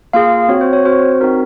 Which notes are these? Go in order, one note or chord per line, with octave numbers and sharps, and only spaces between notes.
A#3 F4 G#4 F5
C4 F#4 C#5
C5
C#5
C4 F#4 C5
C4 D#4 F#4 A#4